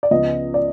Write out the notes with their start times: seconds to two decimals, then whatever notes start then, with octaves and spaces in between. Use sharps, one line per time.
0.03 D5
0.11 C#2 C#3 F3 G#3 B3 D#5
0.54 D5